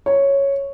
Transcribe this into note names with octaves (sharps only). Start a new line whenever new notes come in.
C#5